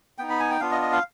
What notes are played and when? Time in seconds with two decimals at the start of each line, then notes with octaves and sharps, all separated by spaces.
0.18 B3 D#4 G5
0.30 B5
0.40 G#5
0.50 G5
0.60 B3 D4 F4 F5
0.71 D#5
0.82 D#5
0.92 F5